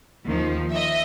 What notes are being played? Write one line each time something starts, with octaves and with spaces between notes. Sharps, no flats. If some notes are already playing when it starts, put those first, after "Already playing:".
D#2 D#3 F3
D#5 E5